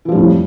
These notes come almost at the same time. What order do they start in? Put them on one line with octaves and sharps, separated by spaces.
E3 F3 G3 A2 F2